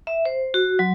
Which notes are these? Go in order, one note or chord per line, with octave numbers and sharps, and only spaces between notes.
E5
C5
F#4
F#3